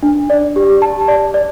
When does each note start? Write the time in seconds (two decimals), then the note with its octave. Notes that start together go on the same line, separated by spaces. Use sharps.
0.03 D4
0.30 D5
0.56 G4
0.82 A5
1.08 D5
1.34 D5